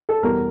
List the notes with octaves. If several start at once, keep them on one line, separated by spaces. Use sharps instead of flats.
A4
E2 B2 G3 A#4